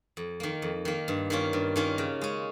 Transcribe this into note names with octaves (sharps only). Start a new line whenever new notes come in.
F2
D#3 A#3
F2
D#3 A#3
G2
D#3 A#3 C#4 F4
G2
D#3 A#3 C#4 F4
C#3
G#3 C#4